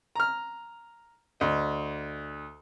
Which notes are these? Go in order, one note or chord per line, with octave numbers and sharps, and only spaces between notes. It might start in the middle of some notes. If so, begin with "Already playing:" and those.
A#5 F6
D2 D#5